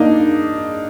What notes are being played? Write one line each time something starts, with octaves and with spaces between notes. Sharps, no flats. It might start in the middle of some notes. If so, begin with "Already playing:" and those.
Already playing: A#3 D4 D#4